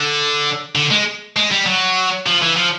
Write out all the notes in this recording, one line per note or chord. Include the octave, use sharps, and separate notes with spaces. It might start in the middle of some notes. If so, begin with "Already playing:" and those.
Already playing: D3
D3
G#3
G#3
G3
F#3
F3
E3
F3